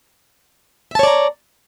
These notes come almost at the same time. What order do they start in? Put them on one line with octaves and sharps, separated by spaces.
E5 A5 C#5 D5 A#5